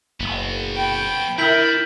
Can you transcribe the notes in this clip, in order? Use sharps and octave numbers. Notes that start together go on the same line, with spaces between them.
F#1 F#3 B3
G5 B5
D3 D4 E4 A#4 G6 B6 F#7